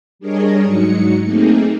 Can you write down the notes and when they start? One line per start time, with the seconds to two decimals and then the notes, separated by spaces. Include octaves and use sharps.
0.19 G3 D4 G#4 A#4 C#5 D#5
0.64 G#2 F#3 D#4 C#7
1.23 A3 A#3 C4 D#4 G#4